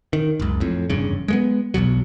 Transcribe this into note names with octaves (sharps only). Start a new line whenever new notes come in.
D#3
F#1 C#2
F2 A2
F1 E2 G2 C#3
G#3 A3 B3
B1 E2 B2 F#3